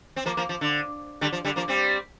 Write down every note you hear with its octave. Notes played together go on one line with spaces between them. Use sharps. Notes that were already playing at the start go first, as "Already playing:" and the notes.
C4
F3 A#3
F3 A#3
F3
D3
D3 G3
F3
D3 G3
F3 A#3
G3 C4